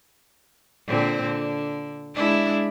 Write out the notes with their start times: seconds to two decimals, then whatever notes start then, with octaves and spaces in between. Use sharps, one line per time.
0.87 A#2 D3 C4
1.22 D3
2.14 G#3 D4 E4